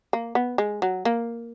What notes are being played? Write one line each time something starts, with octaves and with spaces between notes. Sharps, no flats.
A#3
B3
G#3
F#3
A#3